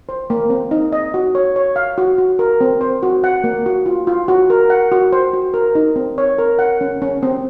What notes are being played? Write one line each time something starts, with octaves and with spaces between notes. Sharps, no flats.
C5
A#3
C4
D#4
D#5
F#4
C#5
C#5
F5
F#4
F#4
A#4
C4
C5
F#4
F#5
A#3
F#4
F4
F4
F#4
A#4
F#5
F#4
C5
F#4
A#4
D#4
C4
C#5
A#4
F#5
C#4
C#4
C4